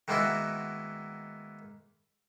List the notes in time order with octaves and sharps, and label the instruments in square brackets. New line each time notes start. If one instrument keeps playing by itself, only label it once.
[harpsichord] D#3 G#3 A#3 B3 E4 F#4